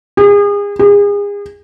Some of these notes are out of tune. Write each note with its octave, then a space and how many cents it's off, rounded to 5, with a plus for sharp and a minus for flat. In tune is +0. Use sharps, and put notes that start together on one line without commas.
G#4 -35
G#4 -35